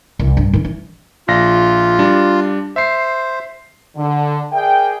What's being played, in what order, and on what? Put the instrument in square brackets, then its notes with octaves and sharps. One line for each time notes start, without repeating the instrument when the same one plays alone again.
[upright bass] C2
G2
D#3 E3
E3
[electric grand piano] A#1 A#6 [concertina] F4
[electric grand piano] G3 D4
[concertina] C5 [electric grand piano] E5 C7
[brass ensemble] D3
G#4 A#4 D5 E5 G5